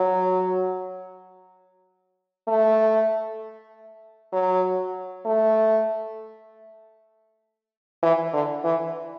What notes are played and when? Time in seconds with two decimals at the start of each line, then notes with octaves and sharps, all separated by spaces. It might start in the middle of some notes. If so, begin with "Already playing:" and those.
Already playing: F#3
2.48 A3
4.33 F#3
5.25 A3
8.03 E3
8.33 D3
8.64 E3